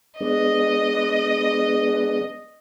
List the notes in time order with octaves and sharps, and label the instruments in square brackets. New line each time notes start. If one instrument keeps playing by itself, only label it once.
[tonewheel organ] G#3 B3 D4 [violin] D#5